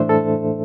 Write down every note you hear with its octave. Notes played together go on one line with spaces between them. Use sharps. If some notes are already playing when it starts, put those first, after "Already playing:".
Already playing: A2 E3 A3 D4 C5 E5
A4